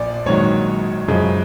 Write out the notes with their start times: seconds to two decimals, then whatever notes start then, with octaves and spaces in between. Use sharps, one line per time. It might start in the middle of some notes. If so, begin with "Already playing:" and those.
Already playing: A#1 A#2 F3 D5
0.26 A#1 G#2 D#3 F#3 C#5
1.08 F#2 C#3 F3 G#3